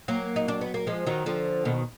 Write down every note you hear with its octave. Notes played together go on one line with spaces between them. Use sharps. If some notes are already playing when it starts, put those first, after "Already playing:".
F#3 A#3
D#4
D4
B3
A#3
F3 G#3
D#3 F#3
D3 F3
B2 D#3